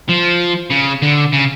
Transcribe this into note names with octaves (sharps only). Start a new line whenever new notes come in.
F3
C#3
D3
C#3